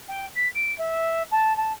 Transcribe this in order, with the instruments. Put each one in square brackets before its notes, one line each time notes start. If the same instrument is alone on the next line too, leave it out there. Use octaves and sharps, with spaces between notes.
[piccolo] G5
B6
D7
E5
A5
A5